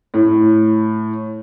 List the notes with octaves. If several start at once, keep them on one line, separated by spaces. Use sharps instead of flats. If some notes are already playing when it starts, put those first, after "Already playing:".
A2